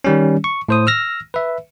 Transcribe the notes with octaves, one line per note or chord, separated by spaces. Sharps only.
D#3 G3 C#4
C#6
A2 C5 D#6
E6 F6 A#6
B4 E5